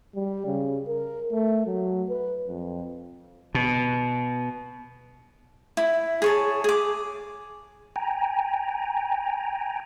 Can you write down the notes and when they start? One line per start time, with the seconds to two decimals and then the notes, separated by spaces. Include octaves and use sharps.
0.15 G3
0.46 C#3
0.88 A#4
1.32 A3
1.67 F#3
2.09 B4
2.48 F2
3.55 B2
5.77 E4
6.22 G#4 C#5 A5
6.64 G#4 D6
7.96 G5 G#5 A#5